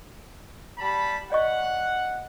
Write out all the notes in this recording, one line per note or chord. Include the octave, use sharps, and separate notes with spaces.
G3 A5 B5
D5 D#5 F#5 C#6